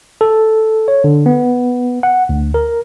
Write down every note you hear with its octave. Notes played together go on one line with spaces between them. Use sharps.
A4
C#5
D3
B3
F#5
D2
A#4